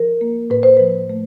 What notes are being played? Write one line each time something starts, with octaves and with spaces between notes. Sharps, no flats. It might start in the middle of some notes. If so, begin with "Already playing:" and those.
Already playing: F3 A#4
A#3
A2 B4
C5
F3 B4
A3